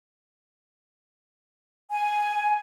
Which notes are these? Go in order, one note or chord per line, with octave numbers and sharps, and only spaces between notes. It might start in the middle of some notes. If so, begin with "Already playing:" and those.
G#5